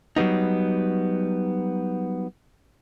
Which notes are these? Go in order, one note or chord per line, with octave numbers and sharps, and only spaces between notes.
F#3 G3 B3 D#4